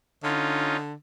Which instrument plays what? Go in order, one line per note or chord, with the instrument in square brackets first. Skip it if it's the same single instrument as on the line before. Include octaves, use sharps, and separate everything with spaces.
[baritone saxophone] D3 [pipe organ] C#4 D#4 F4